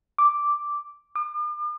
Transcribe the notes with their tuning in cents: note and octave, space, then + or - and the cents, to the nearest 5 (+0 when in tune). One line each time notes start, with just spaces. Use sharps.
D6 -5
D6 +45